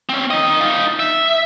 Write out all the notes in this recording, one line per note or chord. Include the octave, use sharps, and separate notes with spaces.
C4 C#4
D#3 D#5
D#4 F4
E5